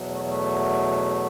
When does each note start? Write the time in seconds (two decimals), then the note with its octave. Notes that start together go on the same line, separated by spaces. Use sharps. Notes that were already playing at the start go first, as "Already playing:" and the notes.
Already playing: E2 B2 F#3
0.08 A3
0.26 A3